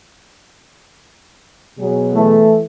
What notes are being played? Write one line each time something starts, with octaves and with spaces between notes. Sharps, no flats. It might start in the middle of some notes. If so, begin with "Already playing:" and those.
B2 F#3 G#4
E3 A3